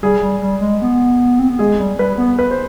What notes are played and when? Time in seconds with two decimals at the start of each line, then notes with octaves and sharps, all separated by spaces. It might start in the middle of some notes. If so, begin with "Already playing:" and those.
0.02 G3 G#4
0.22 G3
0.42 G3
0.61 G#3
0.81 B3
1.39 C4
1.49 B3
1.59 G#3 G#4
1.79 G3
1.99 G3 B4
2.18 B3
2.39 B4
2.51 C5